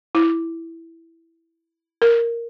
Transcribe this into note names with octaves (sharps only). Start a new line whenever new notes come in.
E4
A#4